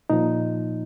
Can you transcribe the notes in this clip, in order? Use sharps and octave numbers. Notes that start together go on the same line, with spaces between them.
A#2 F3 D#4